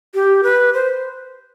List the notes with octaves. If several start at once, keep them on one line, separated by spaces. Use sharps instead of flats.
G4
B4
C5